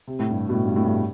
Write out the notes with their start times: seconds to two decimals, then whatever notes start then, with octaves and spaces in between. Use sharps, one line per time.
0.08 C3
0.19 A2
0.31 G2
0.49 B2
0.54 A2
0.65 G2
0.76 A2
0.84 G2
0.88 A2